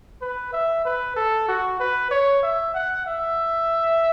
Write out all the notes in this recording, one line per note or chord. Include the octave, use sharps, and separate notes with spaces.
B4
E5
B4
A4
F#4
B4
C#5
E5
F#5
E5